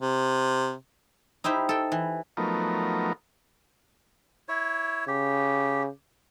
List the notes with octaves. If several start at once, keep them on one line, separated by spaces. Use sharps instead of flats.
C3
D#4 E4 G4 C5
A4 G5
E3
F3 F#3 A3 B3 D#4 A#4
E4 C#5
C#3 G4